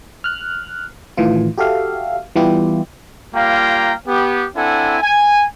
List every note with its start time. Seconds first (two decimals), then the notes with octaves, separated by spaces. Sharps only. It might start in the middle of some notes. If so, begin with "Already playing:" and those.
0.24 F6 F#6
1.17 A2 D#3 E3 F4
1.58 F#4 G4 A4 E5 F5
2.36 E3 G3 B3 E4 F4 G4
3.35 G3 A#3 F4 F5 G5 A#5
4.08 B3 G4
4.55 C4 D4 E4 A4 F#5 G#5
5.01 G#5